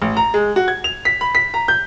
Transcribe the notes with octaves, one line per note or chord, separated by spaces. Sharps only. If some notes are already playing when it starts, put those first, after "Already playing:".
A1
A#5
G#3
F#4
G#6
F7
B6
B5
B6
A#5
G6